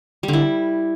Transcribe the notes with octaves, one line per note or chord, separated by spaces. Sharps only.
G3
D3
E4